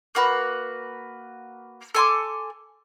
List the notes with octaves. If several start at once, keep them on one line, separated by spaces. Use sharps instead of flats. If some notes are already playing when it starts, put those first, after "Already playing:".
A#3 F#4 B4
A4 G#5 C6 D6